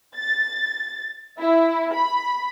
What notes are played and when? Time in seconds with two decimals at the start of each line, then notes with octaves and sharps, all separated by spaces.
0.15 A6
1.39 E4
1.93 B5